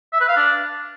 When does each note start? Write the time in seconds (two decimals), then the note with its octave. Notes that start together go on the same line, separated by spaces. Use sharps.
0.13 E5
0.21 B4
0.29 F5
0.37 D4